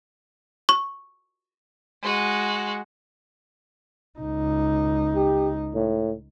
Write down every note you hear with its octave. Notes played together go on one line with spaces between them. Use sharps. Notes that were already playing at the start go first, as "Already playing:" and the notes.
C#6
G#3 F#4
C#2 D#4
G4
A2